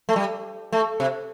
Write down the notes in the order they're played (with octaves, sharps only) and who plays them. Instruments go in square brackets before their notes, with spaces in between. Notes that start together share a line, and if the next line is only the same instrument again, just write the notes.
[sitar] A3
G3
A3
C3